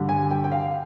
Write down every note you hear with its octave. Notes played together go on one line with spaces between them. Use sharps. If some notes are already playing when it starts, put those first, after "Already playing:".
Already playing: G2 D3 G3
G#5
G5
G5
F5